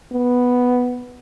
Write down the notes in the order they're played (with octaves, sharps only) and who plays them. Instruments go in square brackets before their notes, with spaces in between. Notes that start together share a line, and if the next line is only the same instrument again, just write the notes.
[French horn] B3